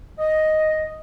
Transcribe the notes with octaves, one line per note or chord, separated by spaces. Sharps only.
D#5